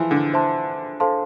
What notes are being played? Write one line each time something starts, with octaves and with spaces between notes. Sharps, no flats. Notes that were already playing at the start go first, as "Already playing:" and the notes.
Already playing: E3 F3 C5 E5 A5 C6
D3
C5 E5 A5 C6
A4 C5 F5 A5 C6